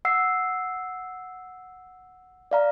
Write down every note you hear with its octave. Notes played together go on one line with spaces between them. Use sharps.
F#5 E6 C7
D5 F5 A#5